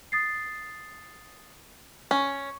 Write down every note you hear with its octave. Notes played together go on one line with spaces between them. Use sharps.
D#6 A6 C7
C#4 C#6